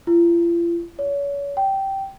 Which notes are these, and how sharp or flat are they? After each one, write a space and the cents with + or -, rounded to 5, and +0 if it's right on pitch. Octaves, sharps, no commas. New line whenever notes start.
F4 -45
C#5 +35
G5 -10